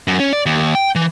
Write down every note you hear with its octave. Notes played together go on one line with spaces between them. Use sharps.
F#2
C#4
D5
D#2
G5
E3